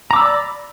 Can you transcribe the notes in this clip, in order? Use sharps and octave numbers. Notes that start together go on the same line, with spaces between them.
D5 A#5 B5 D6 E6